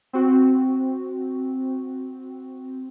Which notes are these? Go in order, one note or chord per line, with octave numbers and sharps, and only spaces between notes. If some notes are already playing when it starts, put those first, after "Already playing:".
C4 F#4